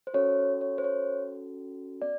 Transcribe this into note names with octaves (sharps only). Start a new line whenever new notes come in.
C5
C#4 F#4 A4 C#5
C#5
C5
C#5
B3 D5